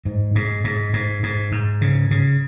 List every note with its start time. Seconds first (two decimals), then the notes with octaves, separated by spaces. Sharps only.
0.05 G#2
0.35 G#2
0.64 G#2
0.93 G#2
1.23 G#2
1.52 G#2
1.81 C#3
2.11 C#3